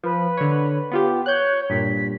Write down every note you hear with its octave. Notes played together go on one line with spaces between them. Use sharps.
F3 B4
D3 C#5
B3 F4 G4
C#5 F#6 G6
G2 A#2 B6